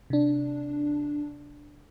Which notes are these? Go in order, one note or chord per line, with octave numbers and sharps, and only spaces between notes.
C3 D4